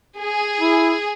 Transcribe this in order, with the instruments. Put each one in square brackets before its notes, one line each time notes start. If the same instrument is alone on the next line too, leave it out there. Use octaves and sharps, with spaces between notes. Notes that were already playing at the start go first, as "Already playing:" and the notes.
[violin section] G#4
[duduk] E4